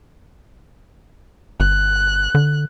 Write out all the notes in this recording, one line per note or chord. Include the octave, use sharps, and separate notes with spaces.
G1 F#6
D3